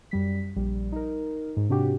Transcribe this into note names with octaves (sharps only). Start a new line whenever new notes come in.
F#2 G3 B6
A#1 G3
D#4 A#4
G#2
G#2 C3 D4 F#4 G4